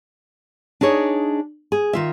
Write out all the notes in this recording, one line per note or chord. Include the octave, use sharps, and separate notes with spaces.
D4 D#4 G#4 C#5
G#4
D#3 F4 E5